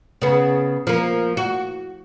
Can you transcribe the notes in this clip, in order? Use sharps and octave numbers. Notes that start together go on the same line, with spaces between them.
C#3 B3
F3 A#3
F#4